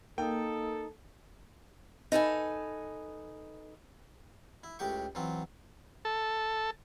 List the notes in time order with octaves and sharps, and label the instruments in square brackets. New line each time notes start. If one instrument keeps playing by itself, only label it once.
[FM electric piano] A#3 [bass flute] D#4 [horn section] A4 [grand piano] G5
[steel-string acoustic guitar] D#4 A4 B4 G#5
[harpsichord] E4
C#2 A2 G4 G5 C#6
E3 F#3 C4 F4
[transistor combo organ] A4